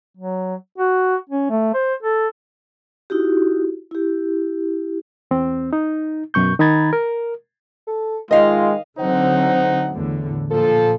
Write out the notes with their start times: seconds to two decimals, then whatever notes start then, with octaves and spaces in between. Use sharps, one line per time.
0.17 F#3
0.78 F#4
1.30 C#4
1.50 A3
1.74 C5
2.03 A4
3.10 D#4 E4 F#4 G4
3.91 E4 G4
5.31 E2 C4
5.73 D#4
6.34 F#2 B2 C#6 G6
6.59 D#3 D#4 A#5 B5 G#6 A6
6.93 A#4
7.87 A4
8.31 D#3 G#3 F4 D#5 F5
8.99 D3 F#3 C4 D#4 C5 F#5
9.91 E2 A2 D3
10.52 A#2 F3 A4